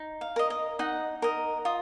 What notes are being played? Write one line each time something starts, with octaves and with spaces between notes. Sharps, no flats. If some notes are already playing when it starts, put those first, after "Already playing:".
Already playing: D#4
F5
A#4 D#5
D#5
D#4 F#5
A#4 D#5
F4 D#6